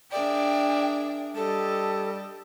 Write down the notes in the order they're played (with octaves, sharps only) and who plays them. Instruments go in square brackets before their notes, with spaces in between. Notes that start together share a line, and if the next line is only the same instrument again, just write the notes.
[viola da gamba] D4 G#4 A#4 [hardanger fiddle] D5 E5 [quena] G5
[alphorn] G3 [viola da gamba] G4 D#5 [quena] A4 [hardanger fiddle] A5